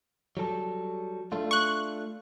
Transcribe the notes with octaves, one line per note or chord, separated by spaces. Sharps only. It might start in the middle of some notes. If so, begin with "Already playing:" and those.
F#3 G3 A4
A3 D4 F4
C#6 F#6